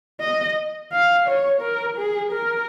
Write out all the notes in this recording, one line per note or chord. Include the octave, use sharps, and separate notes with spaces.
D#5
F5
C#5
A#4
G#4
A#4